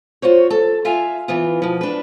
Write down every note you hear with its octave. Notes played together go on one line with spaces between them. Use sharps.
F4 F#4 C5 C#5
A4
F4 E5 F5 G#5
E3 B3 F4
B2 F3
D4 B4